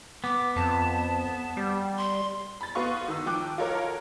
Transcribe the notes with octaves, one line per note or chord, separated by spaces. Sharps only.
B3 D6
F2 A5
G3
C6
B5 A6
B3 F#4 F5 C6 C#6
D#3 E6
F3 G5 D6 F#6
F4 F#4 A4 A#4 C#5